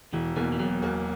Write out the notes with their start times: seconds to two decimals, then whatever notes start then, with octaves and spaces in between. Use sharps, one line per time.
0.13 E1 E3
0.36 E2 B2 E3 A#3
0.52 E3
0.59 E1 F#3
0.82 E2 B2 A#3